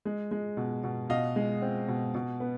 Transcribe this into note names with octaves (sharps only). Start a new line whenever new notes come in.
G#3
G#3
B2
B2
B2 D#5 F5
G#3
C4
B2
B2
B3